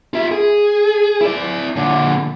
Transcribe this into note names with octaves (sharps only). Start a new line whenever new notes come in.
F4 E5
G#4
E4 D5
A#2 D3